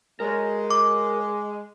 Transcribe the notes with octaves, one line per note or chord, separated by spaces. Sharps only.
G#3 A#4 C#5
D6